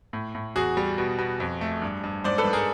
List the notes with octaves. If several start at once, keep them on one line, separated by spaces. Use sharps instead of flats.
A2
A2
E2 F#4 G#4
G3
B2
B2
F2
A3
G2
G2
G#2 C5 D5
A4 B4
G#2
G#4 A#4